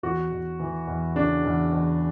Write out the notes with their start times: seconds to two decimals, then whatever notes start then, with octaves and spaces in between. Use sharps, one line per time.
0.03 E2 F#4
0.31 E2
0.60 E3
0.87 E2
1.15 C#3 D4
1.45 E2
1.73 E2